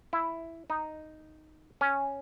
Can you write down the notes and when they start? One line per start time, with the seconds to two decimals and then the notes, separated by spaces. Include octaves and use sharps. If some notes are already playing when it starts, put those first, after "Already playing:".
0.13 E4
0.70 D#4
1.81 C#4